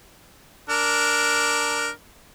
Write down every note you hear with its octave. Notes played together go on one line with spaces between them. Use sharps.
D4 A#4